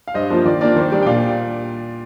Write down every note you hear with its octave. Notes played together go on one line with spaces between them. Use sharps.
F5
G2 C5 D#5
F3 A#3 F4 C5
D#3 D5
A#3 D4 F4 D5
D#3 C5
G3 A#3 D4 D5
G5
A#2 D5 F5